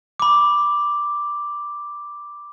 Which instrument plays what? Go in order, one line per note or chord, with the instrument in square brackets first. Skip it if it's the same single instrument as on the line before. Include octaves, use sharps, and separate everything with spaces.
[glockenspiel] B5 D6